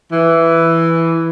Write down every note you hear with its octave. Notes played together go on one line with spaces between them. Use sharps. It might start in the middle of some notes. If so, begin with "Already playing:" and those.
E3